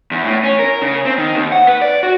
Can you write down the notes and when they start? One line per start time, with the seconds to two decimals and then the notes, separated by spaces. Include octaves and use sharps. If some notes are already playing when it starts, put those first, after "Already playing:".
0.11 E2
0.25 A2
0.43 C#4
0.59 A#4
0.82 C#3
1.05 C4
1.18 D#3
1.35 D#2
1.52 F#5
1.67 B4
1.82 D5
2.03 F#4